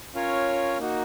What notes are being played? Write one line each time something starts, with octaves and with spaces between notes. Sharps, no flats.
C#4 F4 A#4 C#5
A#3 D#4 F#4